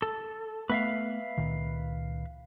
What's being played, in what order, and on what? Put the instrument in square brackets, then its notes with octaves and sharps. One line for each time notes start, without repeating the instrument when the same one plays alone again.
[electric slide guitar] A4
[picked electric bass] A3 B3 [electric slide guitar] B4 E5 F5
[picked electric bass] C#2 A#2 D#3